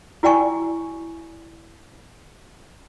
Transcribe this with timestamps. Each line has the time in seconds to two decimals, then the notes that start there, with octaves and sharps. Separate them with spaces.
0.23 E4 F#4 D5 G5 G#5 C#6